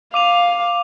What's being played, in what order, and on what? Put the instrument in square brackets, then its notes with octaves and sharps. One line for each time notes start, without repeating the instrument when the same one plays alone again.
[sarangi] F5 [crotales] D6 D#7 F7